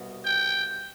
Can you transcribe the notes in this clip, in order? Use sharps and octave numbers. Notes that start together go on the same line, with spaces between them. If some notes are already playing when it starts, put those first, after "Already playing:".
Already playing: C2 B2
G5